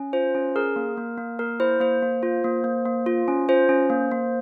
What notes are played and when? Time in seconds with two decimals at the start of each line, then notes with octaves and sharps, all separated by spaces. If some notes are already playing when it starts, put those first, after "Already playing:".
Already playing: C#4
0.13 F4 C5
0.35 C#4
0.56 G#4 A#4
0.76 A#3
0.97 A#3
1.18 A#3
1.39 A#3 A#4
1.60 E4 C5
1.80 A#3 C5
2.02 A#3
2.23 F4
2.44 A#3
2.64 A#3
2.85 A#3
3.06 F4
3.28 C#4
3.49 F4 C5
3.69 C#4
3.90 A#3
4.11 A#3